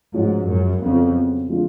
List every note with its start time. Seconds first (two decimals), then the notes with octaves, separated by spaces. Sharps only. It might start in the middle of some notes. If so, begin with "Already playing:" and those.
0.14 G#2 F3 G#3 C#4 F#4
0.48 F#2
0.81 F2 C#3 F#3 B3
1.48 D3 F3 G#3 D4 F4